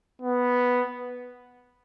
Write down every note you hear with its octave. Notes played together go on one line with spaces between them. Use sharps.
B3